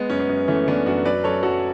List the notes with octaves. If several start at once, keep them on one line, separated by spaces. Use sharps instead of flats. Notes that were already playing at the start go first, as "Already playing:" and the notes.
Already playing: G#3 B3
F#2 C#4
B3
F#2
E3 A3 C#4
E3 B3 D4
F#2 D4 F#4
F#3 B4 D5
F#2 A4 C#5
F#2 F#4 A4